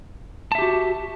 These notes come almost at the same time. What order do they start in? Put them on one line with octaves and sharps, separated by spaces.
A5 E5 G4 F#4